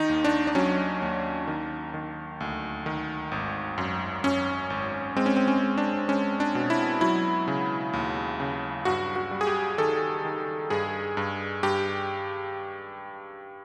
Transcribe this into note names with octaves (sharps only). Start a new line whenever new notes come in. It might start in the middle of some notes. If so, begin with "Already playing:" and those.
Already playing: D#3 D#4
D#2
D4
D4
F#3 C#4
D#2
D#3
D#3
D2
D#3
G#1
F#2
F#2 C#4
G#1
G#3 C4
C#4
C4
C#4
G#3
D4
G#3 C#4
D4
B2
E4
F#3 E4
C#3
D#2
C#3
G2 F#4
F#4
G3
G#4
G4
D#3 A4
D#3
G2 G#4
G2
G2 G4